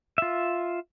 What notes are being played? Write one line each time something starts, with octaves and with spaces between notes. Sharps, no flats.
F4 E5